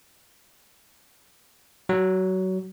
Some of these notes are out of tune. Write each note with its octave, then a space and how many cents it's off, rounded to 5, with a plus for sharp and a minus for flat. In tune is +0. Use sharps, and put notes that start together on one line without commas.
F#3 +20